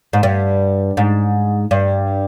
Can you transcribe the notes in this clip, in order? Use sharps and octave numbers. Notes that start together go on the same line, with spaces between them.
G#2
G2
G#2
G2